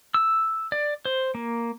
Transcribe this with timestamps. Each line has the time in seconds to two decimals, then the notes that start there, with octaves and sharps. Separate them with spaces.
0.14 E6
0.72 D5
1.05 C5
1.35 A#3